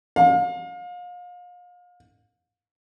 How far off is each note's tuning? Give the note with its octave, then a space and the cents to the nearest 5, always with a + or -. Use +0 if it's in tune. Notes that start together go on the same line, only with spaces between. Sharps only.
F5 +35